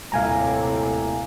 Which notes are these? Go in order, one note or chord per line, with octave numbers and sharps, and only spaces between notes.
D#1 A2 C3 E4 F5 G#5 A#5